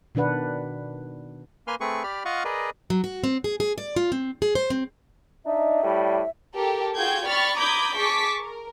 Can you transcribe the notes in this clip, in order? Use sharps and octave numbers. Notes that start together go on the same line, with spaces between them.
B2 D#3 D4 B4 F#5
A#3 B4 G#5 C6 F6
A3 C4 G#4 B4 C#6
G4 D5 B5 F6
F4 D#5 F5 F#5 C#6
G#4 A#4 B4 D5 D#5
F#3
F#4
C4
G#4
G#4
D5
F4
C4
G#4
C5
C4
D4 D#4 E5
A2 G3
G4 A4 A#4
F4 F#4 G#4 G5 G6 G#6
D5 G5 B5 C#6 F6 A6
A#5 B5 D6 D#6 G6 G#6
G#4 A5 C#6 D6 B6
A#4